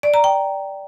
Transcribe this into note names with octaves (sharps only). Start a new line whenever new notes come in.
D5
A#5
G5